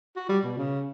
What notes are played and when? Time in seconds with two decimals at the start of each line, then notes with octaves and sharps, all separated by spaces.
0.16 F#4
0.29 G3
0.44 B2
0.57 C#3